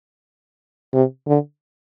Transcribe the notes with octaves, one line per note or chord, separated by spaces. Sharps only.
C3
D3